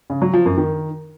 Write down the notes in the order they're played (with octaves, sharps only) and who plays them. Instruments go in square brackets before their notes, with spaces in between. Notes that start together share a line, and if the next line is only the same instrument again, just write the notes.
[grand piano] C#3
F#3
F3
F#2
D#3